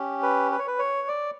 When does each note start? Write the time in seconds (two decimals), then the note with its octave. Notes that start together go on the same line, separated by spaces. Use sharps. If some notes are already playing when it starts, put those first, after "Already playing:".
Already playing: C#4 G4
0.23 B4
0.52 B4
0.59 C#5
0.67 B4
0.79 C#5
1.08 D5